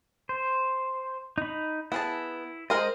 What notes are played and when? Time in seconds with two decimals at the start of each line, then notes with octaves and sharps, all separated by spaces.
0.29 C5
1.38 D#4 B5
1.92 B3 E4 G#4 A5
2.70 G#3 A#4 C5 D#5